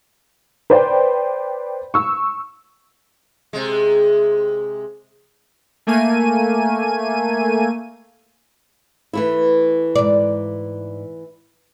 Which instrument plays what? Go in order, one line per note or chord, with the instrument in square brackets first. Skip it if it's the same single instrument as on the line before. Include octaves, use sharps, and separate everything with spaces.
[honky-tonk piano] B4 C5 D5 G5
C#6 E6
[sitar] C3 G#3
[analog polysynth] A3 A#3 G#5 D#7
[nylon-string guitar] E3 A3 E4
[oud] G#2 D5